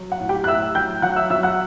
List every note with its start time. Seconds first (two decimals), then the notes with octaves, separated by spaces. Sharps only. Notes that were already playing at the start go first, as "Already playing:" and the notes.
Already playing: F#3
0.12 F#5
0.20 A2
0.29 G4 G5
0.44 F#6
0.47 A2 E5 E6
0.75 F#3 G5 G6
1.02 F#3 F#5 F#6
1.16 E5 E6
1.30 F#3 E5 E6
1.43 F#5 F#6